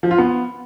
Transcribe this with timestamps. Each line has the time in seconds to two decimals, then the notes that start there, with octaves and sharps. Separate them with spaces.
0.03 F3
0.11 F4
0.18 B3